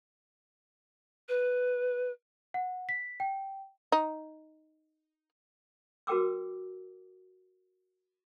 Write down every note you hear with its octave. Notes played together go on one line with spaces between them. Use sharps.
B4
F#5
B6
G5
D#4
F#4 A#4 B4 G5 D6 E6